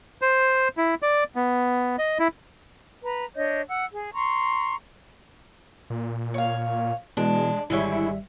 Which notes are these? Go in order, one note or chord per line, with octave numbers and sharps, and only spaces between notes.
C5
E4
D5
B3
D#5
E4
B4 A#5
D4 C#5 D#5 G6
F#5 E6
G#4
A#5 C6 C#6
A#2
C#5 F5
B2 E3 G#3 D4
G#1 D3 G3 G#3 E4 C#5 E5